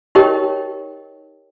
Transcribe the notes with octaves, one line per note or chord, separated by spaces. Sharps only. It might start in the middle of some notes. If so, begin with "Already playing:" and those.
D#4 G4 A#4 C#5 D#5 G5